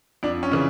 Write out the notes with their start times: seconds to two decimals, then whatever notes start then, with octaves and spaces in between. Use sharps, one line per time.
0.23 F2 D4
0.43 C#4
0.52 C#3 E3